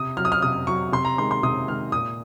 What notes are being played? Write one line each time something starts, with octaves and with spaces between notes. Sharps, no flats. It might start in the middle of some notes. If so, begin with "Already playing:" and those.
Already playing: C3 D#6
F#3 F6
D#6
F6
C3 D#6
F#3 C#6
C3 C6
A#5
D#3 G#3 C6
C6
C3 D#6
D#3 G#3 F6
A#2 D#6